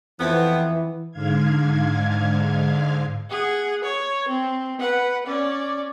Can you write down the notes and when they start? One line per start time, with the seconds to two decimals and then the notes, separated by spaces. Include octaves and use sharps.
0.20 F2 E3 B3
1.11 G#2 D3 F5 G#6
3.30 G#4 F#5
3.84 C#5
4.28 C4
4.80 B4 F#5
5.26 C#4 D5